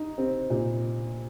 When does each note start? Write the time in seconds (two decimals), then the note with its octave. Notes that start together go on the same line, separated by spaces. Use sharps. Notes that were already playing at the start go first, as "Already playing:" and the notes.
Already playing: D#4
0.18 C4
0.50 A#2